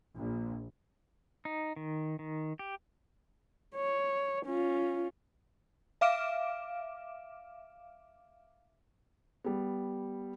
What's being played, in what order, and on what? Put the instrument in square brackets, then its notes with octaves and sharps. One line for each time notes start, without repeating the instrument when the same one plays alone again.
[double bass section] A#1
[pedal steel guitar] D#4
D#3
D#3
G4
[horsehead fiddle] C#5
C#4 F4
[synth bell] E5 F5 D6 F6 D7 E7
[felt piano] G3 B3